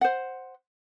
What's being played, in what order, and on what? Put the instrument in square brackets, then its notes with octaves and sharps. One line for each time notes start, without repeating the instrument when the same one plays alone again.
[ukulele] C5 F#5